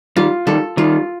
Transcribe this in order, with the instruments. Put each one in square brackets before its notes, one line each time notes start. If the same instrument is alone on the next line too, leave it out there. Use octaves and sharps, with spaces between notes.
[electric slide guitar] D#3 G3 [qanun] F4
[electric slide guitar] D#3 G3 [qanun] A4
[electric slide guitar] D#3 G3 [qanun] F4